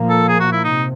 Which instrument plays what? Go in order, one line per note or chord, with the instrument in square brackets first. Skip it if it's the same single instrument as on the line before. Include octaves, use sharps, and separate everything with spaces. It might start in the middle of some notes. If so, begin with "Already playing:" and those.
Already playing: [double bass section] A#2 F3 A#3
[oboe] A4
G#4
F#4
E4
[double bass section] C3 [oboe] D#4